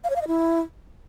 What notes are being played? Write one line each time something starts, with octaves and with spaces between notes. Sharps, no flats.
F5
C#5
F5
D#5
E4